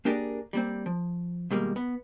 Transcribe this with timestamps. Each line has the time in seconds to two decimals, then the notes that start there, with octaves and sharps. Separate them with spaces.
0.05 A#3 D4 G4 G#4 A#4 D5
0.53 G3 A#3 C4
0.86 F3
1.51 B2 D#3 G3 G#3 A#3
1.76 B3